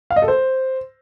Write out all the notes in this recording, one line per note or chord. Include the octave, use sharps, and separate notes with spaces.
F5
D#5
A4
C5